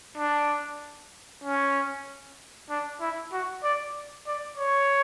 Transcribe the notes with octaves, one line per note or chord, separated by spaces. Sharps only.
D4
C#4
D4
E4
F#4
D5
D5
C#5